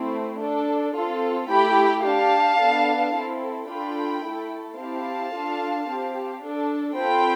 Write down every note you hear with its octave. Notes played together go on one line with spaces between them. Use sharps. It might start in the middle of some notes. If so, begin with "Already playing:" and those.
Already playing: A3 C4 E4
D4 A4
C4 F4 A4
A3 E4 G4 G5 B5
D4 G4 F5 A5
B3 D4 A4
C4 E4 A4
D4 F4 A4 G5 B5
A3 E4 A4
C4 E4 G4 F5 A5
D4 F4 A4
C4 G4
D4 A4
C4 F4 A4 G5 B5